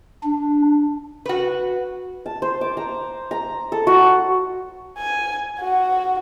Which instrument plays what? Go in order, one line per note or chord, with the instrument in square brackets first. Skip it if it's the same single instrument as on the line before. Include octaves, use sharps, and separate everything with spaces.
[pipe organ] D4
[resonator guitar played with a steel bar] F#4 B4
[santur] A5
C5
D6
A#5
A#5
A4
F#4
[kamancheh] G#5
F#4